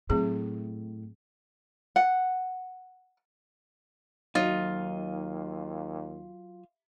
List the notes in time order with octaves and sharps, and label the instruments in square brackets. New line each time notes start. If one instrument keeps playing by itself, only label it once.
[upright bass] A2 [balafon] F#3 C4 G#4
[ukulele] F#5
[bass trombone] D#2 [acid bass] F#3 [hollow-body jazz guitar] D#4 [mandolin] F4